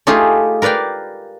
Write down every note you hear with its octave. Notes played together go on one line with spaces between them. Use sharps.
A3 D#4 F4 G4 G#4
A#4 B4 D5 F5 G5